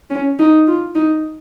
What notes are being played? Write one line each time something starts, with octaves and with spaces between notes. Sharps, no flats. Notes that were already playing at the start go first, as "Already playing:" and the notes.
C#4
D#4
F4
D#4